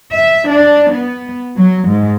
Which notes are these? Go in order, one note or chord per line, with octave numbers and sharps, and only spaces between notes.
E5
D4
B3
F#3
G#2